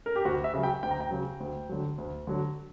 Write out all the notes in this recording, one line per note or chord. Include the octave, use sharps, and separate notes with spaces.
A#4
G4
D2 F#4
E5
C#3 F#3
G5
D2 G5
A#5
G5
C#3 F#3
D2
D3 F#3
D2
D3 F#3